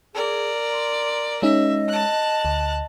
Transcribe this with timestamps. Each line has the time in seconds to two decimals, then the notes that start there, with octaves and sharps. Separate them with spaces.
0.14 G#4 A#4 D5
0.72 C6
1.42 G#3 C#4 D#4 D#5 E5
1.89 A5 F#6
2.45 D2